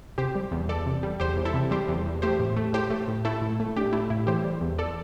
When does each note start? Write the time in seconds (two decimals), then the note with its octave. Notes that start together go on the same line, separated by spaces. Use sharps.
0.18 C3 G4 C5
0.35 G3
0.51 E2
0.69 E2 A4 D5
0.86 C3
1.03 G3
1.20 E2 G4 C5
1.37 E2
1.45 E4 A4
1.54 C3
1.71 G3 G4 C5
1.88 E2
2.06 E2
2.22 A3 G4 C5
2.40 A2
2.56 A3
2.73 A2 G4 C5
2.90 A3
3.08 A2
3.25 A3 E4 A4
3.42 A2
3.60 A3
3.76 A2 D4 G4
3.93 A3 E4
4.10 A2 E4
4.27 E3 G4 C5
4.44 G3
4.61 E2
4.79 A4 D5